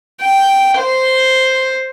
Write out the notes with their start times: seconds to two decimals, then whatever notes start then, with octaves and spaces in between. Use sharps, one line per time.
0.22 G5
0.78 C5